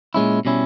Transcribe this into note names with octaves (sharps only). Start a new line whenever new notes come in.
A#2 G#3 C#4 E4
B2 G3 C#4 E4